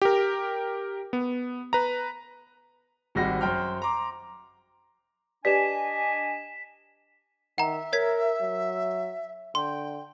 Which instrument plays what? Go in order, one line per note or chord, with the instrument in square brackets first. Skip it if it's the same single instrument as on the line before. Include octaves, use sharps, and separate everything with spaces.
[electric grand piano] G4 A#4
B3
B4 A#5
[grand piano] G#1 G3 G#3 C4 F#4 A#6
F#2 C5 G5 F6
A#5 C6 D6
[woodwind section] D4 D#5 G#5 [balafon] G4 B4 D5 [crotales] B6 E7
[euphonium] D#3 [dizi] E5 [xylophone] F#5 A#5
[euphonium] A#4 [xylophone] C#5 G#6 B6
[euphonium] F#3
[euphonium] D3 [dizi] G5 [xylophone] C6